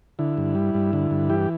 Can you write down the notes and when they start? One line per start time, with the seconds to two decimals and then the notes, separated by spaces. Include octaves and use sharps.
0.19 D3 E4
0.38 G2
0.55 G3
0.74 G2
0.93 D3
1.11 G2
1.29 E3 G4